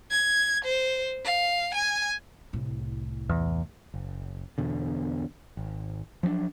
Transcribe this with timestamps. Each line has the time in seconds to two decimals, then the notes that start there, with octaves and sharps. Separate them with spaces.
0.11 G#6
0.64 C5
1.25 F5
1.74 G#5
2.53 C2 A2
3.29 E2
3.94 F#1
4.58 E2 B2 D3
5.57 G#1
6.23 F3 F#3 C4 D4